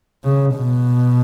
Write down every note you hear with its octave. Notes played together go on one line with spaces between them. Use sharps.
C#3
B2